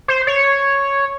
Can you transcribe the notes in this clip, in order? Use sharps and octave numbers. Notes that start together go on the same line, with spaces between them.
C5
C#5